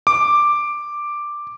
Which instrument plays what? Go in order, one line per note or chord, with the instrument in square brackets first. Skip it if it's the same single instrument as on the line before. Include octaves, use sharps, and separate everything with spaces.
[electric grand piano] D6